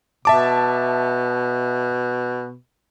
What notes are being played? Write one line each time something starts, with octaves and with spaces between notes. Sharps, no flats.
B2 E5 A5 D6